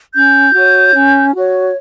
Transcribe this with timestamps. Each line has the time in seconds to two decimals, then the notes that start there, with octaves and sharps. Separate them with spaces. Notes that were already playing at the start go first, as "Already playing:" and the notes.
0.14 C#4 G6
0.54 F#4 C#5
0.94 C#4
1.34 F#4 C#5